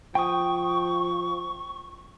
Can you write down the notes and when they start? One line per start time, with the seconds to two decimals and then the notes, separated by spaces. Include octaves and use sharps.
0.15 F3 G5 C#6 D#6